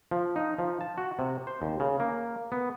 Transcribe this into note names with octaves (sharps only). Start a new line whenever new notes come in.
F3
D#4
F3
A5
F#4
C3
C5
D#2
C#3
A#3
B3